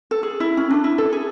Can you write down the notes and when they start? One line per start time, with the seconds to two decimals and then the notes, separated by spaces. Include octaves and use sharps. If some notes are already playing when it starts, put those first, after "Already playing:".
0.11 A4
0.23 G#4
0.40 E4
0.57 C#4
0.70 D4
0.84 E4
0.98 A4
1.13 G#4